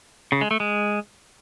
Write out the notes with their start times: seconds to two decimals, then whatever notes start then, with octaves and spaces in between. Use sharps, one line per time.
0.32 C#3
0.41 G#3
0.51 A3
0.60 G#3